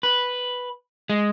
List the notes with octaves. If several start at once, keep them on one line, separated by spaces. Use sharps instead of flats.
B4
G#3